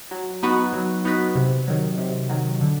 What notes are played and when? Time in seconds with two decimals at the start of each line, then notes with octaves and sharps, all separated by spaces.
0.11 F#3
0.43 B3 D#4 F#4 B4
0.73 F#3
1.05 B3 D#4 F#4 B4
1.35 C3
1.68 D#3 F#3
1.98 C3
2.29 D#3 F#3
2.61 D3